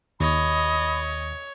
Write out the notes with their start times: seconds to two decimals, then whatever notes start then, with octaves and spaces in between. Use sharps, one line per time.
0.20 D#2 C#5 D#5 B5